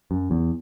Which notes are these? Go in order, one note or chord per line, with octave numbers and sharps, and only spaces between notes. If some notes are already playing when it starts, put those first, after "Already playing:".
F#2
E2